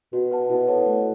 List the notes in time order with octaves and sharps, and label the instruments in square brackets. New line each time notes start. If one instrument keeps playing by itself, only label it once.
[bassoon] B2 [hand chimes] F#4
[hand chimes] B4 F#5 A5
[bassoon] B2 [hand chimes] E4
[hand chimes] A4 C#5 F#5 A5
A3